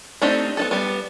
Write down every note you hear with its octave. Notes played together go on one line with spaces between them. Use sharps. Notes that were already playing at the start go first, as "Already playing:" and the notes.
A3 C4 D4 D#4 G4
B3 D#4 A4
G3 B3